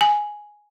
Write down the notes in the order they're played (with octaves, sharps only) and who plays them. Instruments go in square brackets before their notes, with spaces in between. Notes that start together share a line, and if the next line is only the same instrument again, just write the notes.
[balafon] G#5